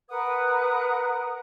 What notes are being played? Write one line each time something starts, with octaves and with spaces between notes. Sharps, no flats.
A#4 B4 F#5 D#6